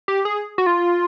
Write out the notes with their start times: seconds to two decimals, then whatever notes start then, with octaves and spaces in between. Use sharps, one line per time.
0.08 G4
0.25 G#4
0.58 F#4
0.66 F4